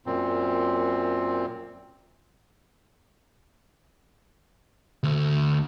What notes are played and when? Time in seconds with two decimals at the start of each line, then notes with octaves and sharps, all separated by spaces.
0.06 F#2 A#2 C4
5.03 D2